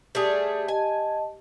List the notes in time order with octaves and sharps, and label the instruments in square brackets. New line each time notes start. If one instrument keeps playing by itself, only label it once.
[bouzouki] G3 A3 G#4 [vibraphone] D5 D#6
[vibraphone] D#5 A5 [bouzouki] G#5